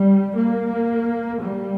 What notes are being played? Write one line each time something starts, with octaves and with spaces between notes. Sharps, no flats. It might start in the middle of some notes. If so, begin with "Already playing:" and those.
Already playing: G3
A#3
G3